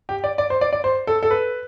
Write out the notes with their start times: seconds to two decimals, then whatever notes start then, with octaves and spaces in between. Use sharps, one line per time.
0.09 G4
0.24 D5
0.38 D5
0.50 C5
0.61 D5
0.73 D5
0.84 C5
1.07 A4
1.23 A4
1.30 B4